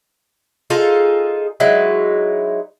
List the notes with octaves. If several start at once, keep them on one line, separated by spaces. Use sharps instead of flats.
D#4 F4 G#4 A4
F#3 G#3 D#4 E4